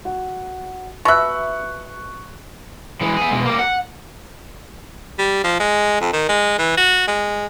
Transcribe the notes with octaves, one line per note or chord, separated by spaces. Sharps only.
F#4
B2 E5 C#6 F#6
E3 G#3
B3 G#4
B2 G#3
G3 A#3
F#5
G3
F3
G#3
F2
D#3
G#3
E3
F#4
G#3